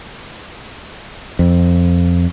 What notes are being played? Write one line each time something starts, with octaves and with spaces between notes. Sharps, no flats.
F2